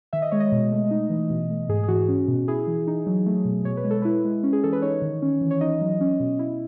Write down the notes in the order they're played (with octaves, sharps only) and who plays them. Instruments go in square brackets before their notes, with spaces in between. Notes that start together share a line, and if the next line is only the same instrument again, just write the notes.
[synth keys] D#3 E5
D#5
G#3 C#5
D#5
B2
A3
D#4
E3
B2
A3
G#2 G#4
G#4
E3 F#4
C#4
B2
E4 G#4
E3
D#4
F#3
A3
B2
B2 C#5
B4
G#3
A4
E4 B4
G#3
C#4
G#4
E3 A4
B4
D#4 C#5
D#3
C#4
E3
C#5
D#4 D#5
F#3
C#4
B2
E4